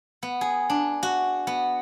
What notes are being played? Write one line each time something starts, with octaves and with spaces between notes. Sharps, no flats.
B3
G#4
D4
F#4
B3